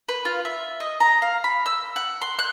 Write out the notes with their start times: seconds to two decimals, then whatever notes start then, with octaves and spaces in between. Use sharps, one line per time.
0.09 B4
0.25 F4
0.45 E5
0.80 D#5
1.00 A#5
1.22 F5
1.44 B5
1.66 E6
1.96 F#5
2.22 C6
2.39 F#6